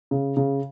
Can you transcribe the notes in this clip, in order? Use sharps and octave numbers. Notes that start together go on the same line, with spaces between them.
C#3
C#3